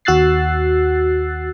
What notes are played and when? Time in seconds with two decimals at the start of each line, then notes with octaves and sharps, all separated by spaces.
0.05 D#2 F#4 E6 F#6 A6 C7